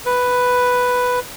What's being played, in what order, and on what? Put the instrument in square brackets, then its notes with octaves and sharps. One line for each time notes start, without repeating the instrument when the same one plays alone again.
[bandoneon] B4